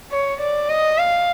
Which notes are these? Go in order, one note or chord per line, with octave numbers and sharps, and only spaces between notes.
C#5
D5
D#5
F5